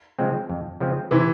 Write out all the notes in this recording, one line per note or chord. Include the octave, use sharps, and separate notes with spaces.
C#3 F3 G#3 C4
F2
C#3 F3 G#3 C4
C3 E3 E4